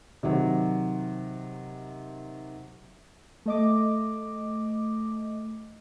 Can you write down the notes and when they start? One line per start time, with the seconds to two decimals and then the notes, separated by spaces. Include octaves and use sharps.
0.23 C3 D#3 F#3
3.46 A3 D#5 D6